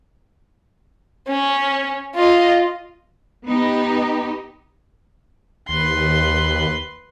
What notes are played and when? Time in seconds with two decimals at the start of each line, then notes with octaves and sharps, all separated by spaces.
1.28 C#4
2.15 F4 D#5
3.45 B3 D#4 G4
5.69 D#2 B4 C6